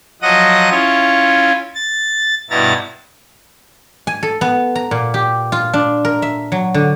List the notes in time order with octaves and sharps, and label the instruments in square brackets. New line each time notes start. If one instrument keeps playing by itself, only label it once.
[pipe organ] F3 F#3 D#5 F#5 D#6 A#6
C#4 E4 F4 C#5
A6
G2 B2 E4 A#5 A6
[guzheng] G#5
A4
B3
A#5
A#2
G4
F4
D4
A#4
E5
F#3
D3